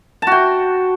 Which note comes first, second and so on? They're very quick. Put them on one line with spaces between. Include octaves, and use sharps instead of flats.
A5 F#4 G5